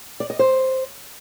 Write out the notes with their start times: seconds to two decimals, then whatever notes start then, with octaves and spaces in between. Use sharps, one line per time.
0.20 D5
0.30 D#5
0.39 C5